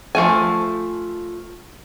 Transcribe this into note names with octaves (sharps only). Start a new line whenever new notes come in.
F3 A3 G#5